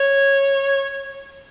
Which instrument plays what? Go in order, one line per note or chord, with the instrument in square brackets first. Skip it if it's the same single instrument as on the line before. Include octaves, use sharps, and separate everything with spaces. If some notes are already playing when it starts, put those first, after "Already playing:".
Already playing: [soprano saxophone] C#5